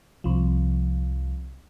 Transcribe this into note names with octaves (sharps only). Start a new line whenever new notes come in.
C2 F3